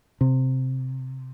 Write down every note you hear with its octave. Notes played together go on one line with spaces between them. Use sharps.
C3